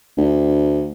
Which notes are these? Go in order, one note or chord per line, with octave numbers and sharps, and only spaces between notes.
D2